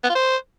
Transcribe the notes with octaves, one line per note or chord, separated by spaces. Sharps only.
B3
F4
C5